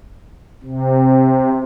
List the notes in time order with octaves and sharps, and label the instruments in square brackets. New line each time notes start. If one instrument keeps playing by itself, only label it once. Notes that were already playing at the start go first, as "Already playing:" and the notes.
[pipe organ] C3